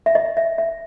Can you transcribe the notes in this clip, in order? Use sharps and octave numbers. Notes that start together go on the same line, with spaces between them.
E5
D#5
E5
E5